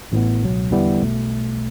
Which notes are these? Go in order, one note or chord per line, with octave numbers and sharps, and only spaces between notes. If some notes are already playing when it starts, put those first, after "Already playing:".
A1 A2 E3 B3
C#2 B2 F#3
E2 D3 G3 B3 E4
B1 B2 A3